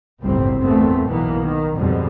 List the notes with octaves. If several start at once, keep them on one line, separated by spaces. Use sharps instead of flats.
G1 C#2 F#2 A2 G3 C4
E2 A#2 A3 B3 C4
B1 E3 A#3 B3
D#3
G#1 F2 G#2 B2 D3 G3